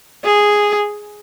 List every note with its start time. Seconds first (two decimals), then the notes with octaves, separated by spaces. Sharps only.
0.24 G#4